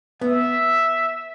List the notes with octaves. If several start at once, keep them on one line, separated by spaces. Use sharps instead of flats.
B3 E5